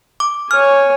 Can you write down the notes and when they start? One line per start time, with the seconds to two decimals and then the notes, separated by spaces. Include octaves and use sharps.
0.20 D6
0.51 C#5 G#5 F6